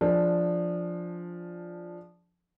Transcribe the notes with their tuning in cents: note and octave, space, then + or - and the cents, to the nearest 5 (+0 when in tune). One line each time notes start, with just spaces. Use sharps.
F3 +0 D4 +0 G#4 +0